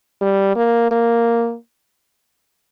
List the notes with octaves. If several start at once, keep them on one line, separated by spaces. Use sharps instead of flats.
G3
A#3
A#3